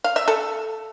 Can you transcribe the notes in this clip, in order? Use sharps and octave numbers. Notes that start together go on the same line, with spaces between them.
F5
E5
A4